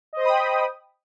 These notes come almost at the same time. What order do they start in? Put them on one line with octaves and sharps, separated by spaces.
D#5 C5 D#6 B5 G5